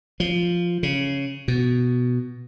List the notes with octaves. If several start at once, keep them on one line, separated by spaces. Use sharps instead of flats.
F3
C#3
B2